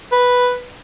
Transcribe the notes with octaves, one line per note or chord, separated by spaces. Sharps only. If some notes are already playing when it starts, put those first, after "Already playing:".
B4